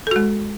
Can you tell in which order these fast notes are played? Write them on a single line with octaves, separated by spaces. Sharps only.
A4 F#4 G#3